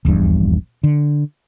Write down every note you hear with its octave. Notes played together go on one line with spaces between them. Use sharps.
D#1 A#1 E2 G2
D3